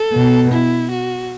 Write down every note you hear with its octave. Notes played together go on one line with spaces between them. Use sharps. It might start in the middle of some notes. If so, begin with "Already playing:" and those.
Already playing: A4
B2
E4
F#4